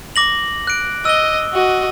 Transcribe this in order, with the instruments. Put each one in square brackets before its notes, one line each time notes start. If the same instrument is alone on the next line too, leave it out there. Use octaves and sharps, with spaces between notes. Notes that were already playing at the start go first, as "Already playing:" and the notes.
[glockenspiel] D6 A#6 F#7
F#6 D7
[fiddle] D#5 [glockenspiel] E6 G7
[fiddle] F#4 D#5